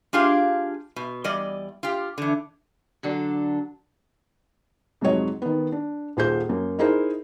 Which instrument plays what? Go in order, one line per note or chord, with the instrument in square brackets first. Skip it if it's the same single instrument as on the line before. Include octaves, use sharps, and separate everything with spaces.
[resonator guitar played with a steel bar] D4 F4 G4 G#4 F5
B2
E2 G3 D5 D#5
F4 G4
D3 E3
[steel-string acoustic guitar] D3 F#3 D4 A4
[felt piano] F2 G#2 C3 F#3 C#5 D#5
D#3 B3
D4
D#1 F4 G#4 C5 G6
F#2 A#3
D#4 E4 G#4 A#4 C5 D#5